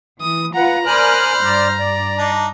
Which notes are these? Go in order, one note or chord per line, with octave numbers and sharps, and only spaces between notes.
E3 D#6
F4 B4 F#5 A#5
A#4 C5 D5 G#5 B5 F6 F#6
G2 D5 A#5
D5
D4 D#4